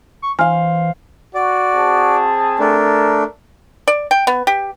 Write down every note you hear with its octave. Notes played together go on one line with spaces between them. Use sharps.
C#6
E3 C5 F5 G#5 F6
F#4 D5
C4 G#4 A5
A3 D4 A#4
D5
G5
B3
G4